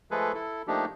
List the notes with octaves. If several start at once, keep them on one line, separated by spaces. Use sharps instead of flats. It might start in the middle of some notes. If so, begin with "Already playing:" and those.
F3 G#3 A3 G#4 A4 B4
E4 A4
F3 A3 A#3 D4 D#4 G4